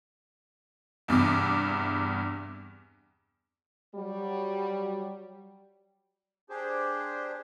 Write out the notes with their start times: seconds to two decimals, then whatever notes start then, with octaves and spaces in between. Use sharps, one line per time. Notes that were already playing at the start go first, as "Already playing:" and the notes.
1.08 E2 G2 C3 D6
3.95 F#3 G3
6.50 D4 G4 G#4 C5